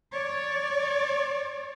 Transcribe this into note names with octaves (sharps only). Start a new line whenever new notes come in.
C#5 D5